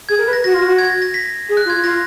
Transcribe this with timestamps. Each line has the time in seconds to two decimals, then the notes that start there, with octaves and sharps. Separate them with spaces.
0.09 G#4 G#6
0.18 A#4
0.27 B4
0.33 A#6
0.44 F#4 A#6
0.54 F4
0.64 F#4
0.78 G#6
0.90 A#6
1.02 A#6
1.14 B6
1.49 G#4
1.57 F#6
1.66 F4
1.70 G#6
1.83 F4 A#6